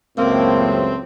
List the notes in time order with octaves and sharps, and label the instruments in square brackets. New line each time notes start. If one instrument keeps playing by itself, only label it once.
[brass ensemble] C#2 F#2 A2 [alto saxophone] A#3 [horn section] C4